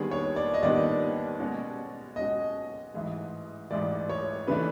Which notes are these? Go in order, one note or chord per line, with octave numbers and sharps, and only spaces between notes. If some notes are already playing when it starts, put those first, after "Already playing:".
Already playing: D#2 D#3 G3 B3 D4 G#4
C#5
D5
D#5
D#2 D#3 G3 B3 D4 D5
B2 G#3 C#4 F#4
B2 G#3 C#4 F#4 D#5
A1 G#2 E3
A1 G#2 E3 D5
C#5
C#3 E3 A3 D4 B4